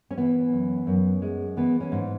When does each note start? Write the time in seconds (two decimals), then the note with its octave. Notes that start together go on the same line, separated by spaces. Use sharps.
0.11 C#4
0.17 E3 B3
0.52 F#2
0.87 F#2
1.22 G#3
1.57 E3 B3
1.81 C#4
1.92 G#2